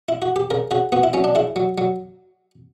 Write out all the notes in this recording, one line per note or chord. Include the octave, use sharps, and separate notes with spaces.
E4
F#4
G4
C#3 A#4
C#3 F#4
B3 F#4
E4
F#3 C#4
D4
C#3 E4
F#3
F#3